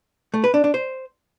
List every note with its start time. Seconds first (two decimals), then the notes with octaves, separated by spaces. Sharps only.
0.34 A3
0.44 B4
0.54 D4
0.64 D4
0.74 C5